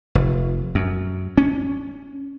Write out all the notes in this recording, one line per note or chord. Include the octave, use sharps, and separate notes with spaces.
F1
F#2
C#4